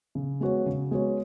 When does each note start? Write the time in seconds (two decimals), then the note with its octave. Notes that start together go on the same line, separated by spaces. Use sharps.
0.15 C#3
0.41 G#3 B3 F#4 C#5
0.66 C#3
0.91 G#3 B3 F#4 C#5